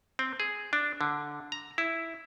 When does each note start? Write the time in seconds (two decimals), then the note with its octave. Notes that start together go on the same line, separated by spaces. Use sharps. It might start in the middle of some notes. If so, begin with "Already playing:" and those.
0.19 C4
0.40 G#4
0.73 D4
1.01 D3
1.52 A#5
1.78 E4